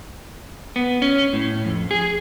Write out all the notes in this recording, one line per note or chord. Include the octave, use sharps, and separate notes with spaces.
B3
C#4
A2
F2
G#4